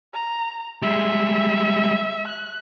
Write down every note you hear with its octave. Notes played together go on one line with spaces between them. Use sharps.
A#5
G3 G#3 E5
F#6